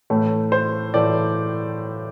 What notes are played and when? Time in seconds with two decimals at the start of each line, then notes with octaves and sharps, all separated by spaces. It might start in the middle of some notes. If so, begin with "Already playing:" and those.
0.10 A2 E3 A3
0.52 C5
0.94 A2 E3 A3 D5